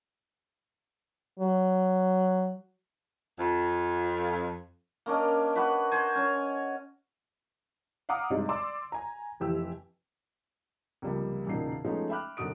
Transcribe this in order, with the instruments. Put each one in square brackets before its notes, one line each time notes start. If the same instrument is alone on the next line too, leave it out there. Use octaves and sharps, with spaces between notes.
[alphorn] F#3
[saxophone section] F2 F4
[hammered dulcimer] A#3 C#4 D4 D#5
F#4 B4 B5
C5 G#5
C#4 C#5
[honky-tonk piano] F5 F#5 A#5 D6 D#6 F6
G2 C3 G#3 D4 D#4
D5 C6 D6 E6
G#5 A#5
F1 E3 G4 E6
[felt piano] C#2 C3 F3 G3 A#3
E1 A#2 C#3 D#4 C7
F3 G#3 A3 B3 C#4 D#4
E5 G5 B5 D6 F6 F#6
B1 F#2 D3 F#4 D#6 D7